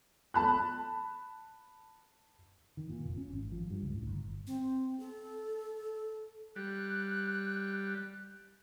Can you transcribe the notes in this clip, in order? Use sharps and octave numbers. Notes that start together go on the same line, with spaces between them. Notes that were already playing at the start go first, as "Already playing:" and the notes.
A5 B5 F#6
D#3
A#2
F1
C#4
G#1
F3
G2
C#2
A2
G1
C4
A4
G3 F#6